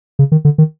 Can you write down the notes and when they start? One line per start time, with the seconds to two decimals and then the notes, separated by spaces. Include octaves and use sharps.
0.19 C#3
0.32 D#3
0.45 D3
0.58 D#3